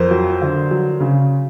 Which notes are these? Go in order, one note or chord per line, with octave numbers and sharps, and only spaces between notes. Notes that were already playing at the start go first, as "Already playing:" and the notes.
Already playing: F2 A#4 C5
F#3
D3
F#3
C#3